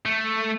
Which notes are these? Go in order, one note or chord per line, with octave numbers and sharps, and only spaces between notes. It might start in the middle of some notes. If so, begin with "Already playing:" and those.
A3